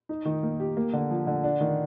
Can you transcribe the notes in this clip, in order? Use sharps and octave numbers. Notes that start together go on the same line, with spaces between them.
D#4
D#3
A#3
G4
A#3
D3
F3
D3
D4
D#3